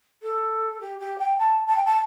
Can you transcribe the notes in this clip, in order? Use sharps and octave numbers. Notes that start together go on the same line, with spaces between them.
A4
G4
G4
G5
A5
A5
G5
A5